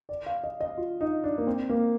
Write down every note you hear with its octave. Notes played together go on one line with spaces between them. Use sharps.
D5
F5
D#5
D#5
F4
D#4
D4
A#3
C4
A#3